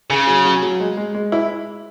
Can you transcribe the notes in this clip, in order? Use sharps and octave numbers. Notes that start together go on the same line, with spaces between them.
C#3 G#4
F#3
F#3
F#3
G#3
G#3
G#3
E4